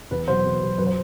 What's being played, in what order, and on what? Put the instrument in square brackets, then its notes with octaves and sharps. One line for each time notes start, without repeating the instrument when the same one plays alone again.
[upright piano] E2 B4
B2 F#3 C5
E2
B2 F#3
F#2 B4
C5